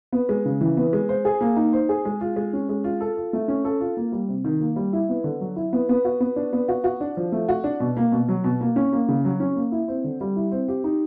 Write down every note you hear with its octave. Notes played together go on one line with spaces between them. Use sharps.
B3
G#3
C#3
E3
B3
G#3
C5
G#4
A#3
D#4
C5
G#4
G#3
F4
G#3
C#4
G#3
F4
A4
F4
A3
C#4
A4
F4
A#3
G3
C3
D#3
A#3
G3
E4
B3
D3
F#3
E4
B3
B3
F#4
B3
D4
B3
F#4
F#4
D4
F3
A3
F#4
D4
B2
A#3
B2
F#3
B2
A#3
C#4
A#3
C#3
F#3
C#4
A#3
E4
C4
D3
G3
E4
C4
G4
D#4